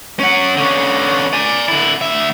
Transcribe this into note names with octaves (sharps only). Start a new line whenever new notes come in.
C#4 F#5
D3 C#4
D5 G#5
D3 E4
D2 E5